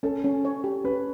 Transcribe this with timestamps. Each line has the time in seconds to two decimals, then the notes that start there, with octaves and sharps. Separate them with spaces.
0.03 C#4 A4
0.24 C#4
0.45 C#5
0.64 G4
0.84 C#4 B4